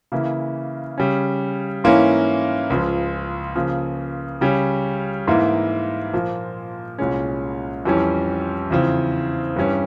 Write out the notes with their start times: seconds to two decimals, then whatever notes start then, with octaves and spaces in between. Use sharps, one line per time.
0.12 C#3 E3 A#3 E4
0.98 C#3 G3 C#4
1.84 G#2 E3 A#3 C#4 E4
2.70 C#2 C#3 F3
3.55 C#3 F3 A#3
4.41 C#3 G3 C#4
5.28 G#2 E3 A#3 E4
6.14 A#2 F3 A#3
6.99 C2 A#2 G#3 C#4
7.85 F2 E3 G3 C#4
8.71 E2 C#3 F3 C4
9.56 G2 E3 G3 C#4